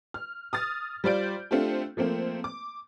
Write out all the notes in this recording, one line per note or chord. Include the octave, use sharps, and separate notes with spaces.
F6
D#6 F6 A6
G3 F4 C5 D5 G6 D7
A3 C4 D4 F4 G4
F3 A3 A#3 C4
D6